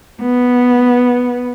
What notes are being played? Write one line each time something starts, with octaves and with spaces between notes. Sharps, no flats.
B3